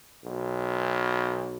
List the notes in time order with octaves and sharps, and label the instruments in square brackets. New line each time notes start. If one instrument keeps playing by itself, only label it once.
[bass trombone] B1